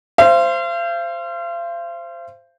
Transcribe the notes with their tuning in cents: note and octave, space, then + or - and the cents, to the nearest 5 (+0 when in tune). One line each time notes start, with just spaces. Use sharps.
C5 +0 F5 -40